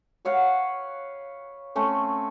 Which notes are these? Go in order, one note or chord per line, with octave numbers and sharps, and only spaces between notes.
B4 C#5 F5 F#5
A3 C4 C#4